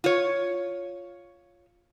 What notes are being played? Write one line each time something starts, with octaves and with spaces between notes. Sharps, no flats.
F4 C#5